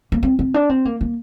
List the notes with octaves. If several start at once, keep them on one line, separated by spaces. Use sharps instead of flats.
A#3
C4
C4
D4
C4
A#3
A#3